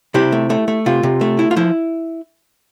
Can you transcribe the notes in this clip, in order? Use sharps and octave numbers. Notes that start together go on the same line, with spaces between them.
C3 E4 G4
A3
A3
A3
C3 F4
C3
A3
E4
F4
F3 E4